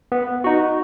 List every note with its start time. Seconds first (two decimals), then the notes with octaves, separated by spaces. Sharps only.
0.12 B3
0.44 D#4 F#4